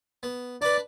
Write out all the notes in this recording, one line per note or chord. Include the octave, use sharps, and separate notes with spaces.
B3
D4 B4 D5